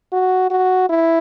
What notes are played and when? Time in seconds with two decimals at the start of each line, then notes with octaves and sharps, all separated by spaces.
0.13 F#4
0.51 F#4
0.89 E4